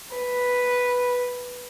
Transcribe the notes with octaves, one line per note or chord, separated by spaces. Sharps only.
B4